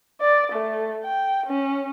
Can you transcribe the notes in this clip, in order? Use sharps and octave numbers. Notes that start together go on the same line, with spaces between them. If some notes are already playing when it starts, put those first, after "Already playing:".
D5
A3
G5
C#4